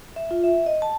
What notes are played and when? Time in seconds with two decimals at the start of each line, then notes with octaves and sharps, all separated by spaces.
0.16 E5
0.31 F4
0.44 E5
0.66 D#5
0.82 A5